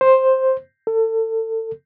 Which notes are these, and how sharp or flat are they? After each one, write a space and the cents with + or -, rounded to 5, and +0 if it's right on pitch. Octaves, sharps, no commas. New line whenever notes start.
C5 +5
A4 +30